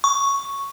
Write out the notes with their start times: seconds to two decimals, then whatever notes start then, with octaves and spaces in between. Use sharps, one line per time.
0.04 C#6